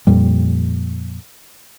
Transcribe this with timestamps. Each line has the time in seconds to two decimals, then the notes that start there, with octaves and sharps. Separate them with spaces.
0.07 F2 A#2 G3